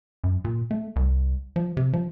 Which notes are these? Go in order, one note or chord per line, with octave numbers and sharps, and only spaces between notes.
F#2
A#2
A3
C2
F3
C3
F3